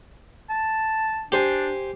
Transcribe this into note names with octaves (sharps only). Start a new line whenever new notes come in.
A5
D4 G4 C5 G#5